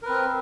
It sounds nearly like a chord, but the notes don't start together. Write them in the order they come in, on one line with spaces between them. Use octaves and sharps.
A#4 B4 C4